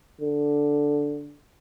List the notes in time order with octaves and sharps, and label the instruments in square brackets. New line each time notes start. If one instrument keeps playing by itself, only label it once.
[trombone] D3